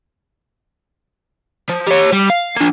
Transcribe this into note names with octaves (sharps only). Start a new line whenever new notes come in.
F3
G4 C#5
G3
F5
A#3 D4